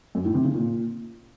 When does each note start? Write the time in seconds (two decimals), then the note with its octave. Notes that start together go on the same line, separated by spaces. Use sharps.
0.15 F#2
0.25 A2
0.35 C3
0.44 C#3
0.54 A#2